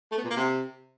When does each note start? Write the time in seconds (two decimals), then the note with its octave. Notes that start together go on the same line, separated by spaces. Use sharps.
0.12 A3
0.18 B3
0.24 A#2
0.30 A#3
0.36 C3